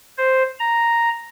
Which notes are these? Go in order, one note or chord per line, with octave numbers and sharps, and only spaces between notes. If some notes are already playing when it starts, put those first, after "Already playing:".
C5
A#5